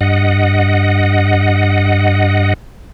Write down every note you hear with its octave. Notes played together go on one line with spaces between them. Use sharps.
G2 D#5 F#5